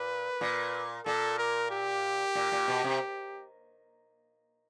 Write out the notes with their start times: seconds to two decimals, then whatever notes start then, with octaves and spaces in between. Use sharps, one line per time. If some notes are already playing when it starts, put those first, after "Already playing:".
Already playing: A#2 B4
0.41 A#2
1.06 A#2 A4
1.38 A#4
1.71 G4
2.35 A#2
2.52 A#2
2.68 B2
2.84 C3